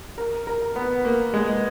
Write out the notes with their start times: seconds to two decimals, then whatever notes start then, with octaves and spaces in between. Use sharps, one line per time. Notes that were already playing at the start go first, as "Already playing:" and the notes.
0.18 A#4
0.47 A#4
0.76 B3
1.05 A#3
1.34 G#3